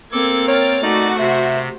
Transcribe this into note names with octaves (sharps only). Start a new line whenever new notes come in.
A#3 C4 A4 D6 G#6
A#4 C#5 G5 F6 A6
A3 D#4 F#4 D5 D6
C3 C5 E5